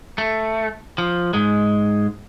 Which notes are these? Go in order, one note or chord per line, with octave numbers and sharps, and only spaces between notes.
A3
F3
G#2 G#3